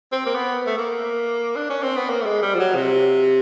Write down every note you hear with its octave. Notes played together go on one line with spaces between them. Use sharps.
C4
A#3
B3
A3
A#3
D4
C#4
C4
B3
A#3
A3
G#3
G3
F3
F#3
C3